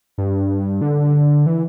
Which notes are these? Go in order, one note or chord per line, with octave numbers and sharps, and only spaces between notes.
G2
D3
E3